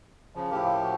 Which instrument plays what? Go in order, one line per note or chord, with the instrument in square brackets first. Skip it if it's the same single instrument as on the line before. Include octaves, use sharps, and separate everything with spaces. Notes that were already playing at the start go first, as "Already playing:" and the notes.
[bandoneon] C#3 F3
[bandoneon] A2 F3 G4 [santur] A#3 E4
[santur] F#4